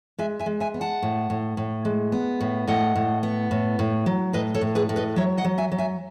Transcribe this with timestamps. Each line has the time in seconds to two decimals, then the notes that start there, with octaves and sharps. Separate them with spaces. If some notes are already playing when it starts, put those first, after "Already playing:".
0.19 G#3 E5 G#5
0.39 E5 G#5
0.46 G#3
0.60 E5 G#5
0.74 B3
0.81 F#5 A5
1.02 A2
1.30 A2
1.57 A2
1.85 G#3
2.12 B3
2.40 A2
2.67 A2 D#5 F#5
2.96 A2
3.23 B3
3.51 A2
3.79 A2
4.06 F#3
4.33 A2 B4 D#5
4.54 A4 C#5
4.61 A2
4.75 G#4 B4
4.89 A2
4.96 B4 D#5
5.16 F#3 C#5 E5
5.37 D#5 F#5
5.44 F#3
5.58 E5 G#5
5.72 F#3
5.78 E5 G#5